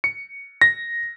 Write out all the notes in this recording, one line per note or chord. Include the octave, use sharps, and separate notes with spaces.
C#7
A#6